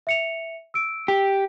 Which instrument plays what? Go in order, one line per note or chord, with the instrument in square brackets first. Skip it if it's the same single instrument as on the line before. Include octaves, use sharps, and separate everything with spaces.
[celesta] E5 C#7 F7
E6 D7
[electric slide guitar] G4